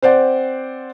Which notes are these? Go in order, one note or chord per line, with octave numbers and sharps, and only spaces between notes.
C4 C5 D5 F#5